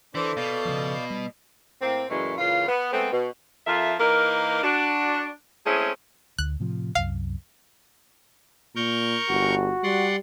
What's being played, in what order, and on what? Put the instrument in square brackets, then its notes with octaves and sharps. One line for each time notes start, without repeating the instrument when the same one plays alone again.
[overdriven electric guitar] E3 [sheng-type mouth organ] D4 C5 [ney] A4
[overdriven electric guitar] B2 [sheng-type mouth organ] D5 F5 G6
[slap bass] C#3 F3
G3
[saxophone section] A2 A#3 C4
F#2 A#2 E3 G#3 A3
A#2 C#3 E3 F4
B3
G#3 A3 B3 C4
B2
F2 F3 F4 A#4 E5
E3 A#3 D#4 A#4
D4 F#4
G#3 A3 C4 C#4 E4 G#4
[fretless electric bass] D2 [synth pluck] F#6
[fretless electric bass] A2 C3 F3
[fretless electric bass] C2 F#2 [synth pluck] F5
[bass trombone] A#2 [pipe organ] A#4 C#6 G6
[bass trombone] G1 [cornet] F#4
[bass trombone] G3 [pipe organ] D5 F#5 C6